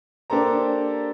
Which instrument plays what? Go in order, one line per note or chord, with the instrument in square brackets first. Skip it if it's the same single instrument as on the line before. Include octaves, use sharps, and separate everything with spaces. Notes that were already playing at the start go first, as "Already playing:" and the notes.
[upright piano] A#3 D4 G4 A4 C5 A#5